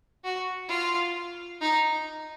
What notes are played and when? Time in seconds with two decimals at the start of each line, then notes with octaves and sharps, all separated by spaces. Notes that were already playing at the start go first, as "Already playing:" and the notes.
0.24 F#4
0.69 F4
1.61 D#4